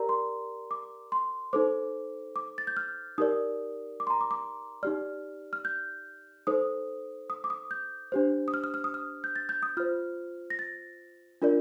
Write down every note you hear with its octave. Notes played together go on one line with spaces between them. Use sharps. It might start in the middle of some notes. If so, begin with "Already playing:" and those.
Already playing: G4 A#4 D5 A#5
C6
D6
C6
D#4 A4 C5 D6
D6
A6
G6
F6
D#4 G4 A#4 D5 D#6
D6
C6
A#5
D6
D6
D#4 G4 D5 F6
F6
G6
D#4 A4 C5 D#6
D#6
D6
D#6
G6
D4 G4 C5
D#6
F6
F6
F6
D#6
F6
G6
A6
G6
D#6
F4 C5 F6
A#6
A6
D4 F4 A#4 D5